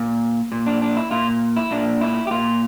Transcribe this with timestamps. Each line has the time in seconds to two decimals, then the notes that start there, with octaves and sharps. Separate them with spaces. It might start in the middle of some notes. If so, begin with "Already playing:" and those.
Already playing: A#2
0.52 A#2
0.66 D4
0.82 D4
0.97 E4
1.11 A#2 F4
1.56 E4
1.71 A#2 D4
2.01 E4
2.27 G4
2.31 A#2 F4